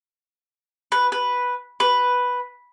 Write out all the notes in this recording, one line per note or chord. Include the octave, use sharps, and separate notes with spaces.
B4
B4
B4